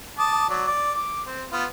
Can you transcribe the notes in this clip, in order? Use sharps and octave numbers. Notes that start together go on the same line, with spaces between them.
A5 D6 D#6
F#3 D5
D5 D6
D6
C4
B3 F4